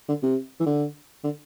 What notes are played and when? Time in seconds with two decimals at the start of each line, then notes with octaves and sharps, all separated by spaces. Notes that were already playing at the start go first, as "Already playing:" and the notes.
0.08 D3
0.23 C3
0.60 E3
0.67 D3
1.24 D3